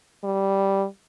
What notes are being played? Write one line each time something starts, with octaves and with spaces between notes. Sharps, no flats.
G3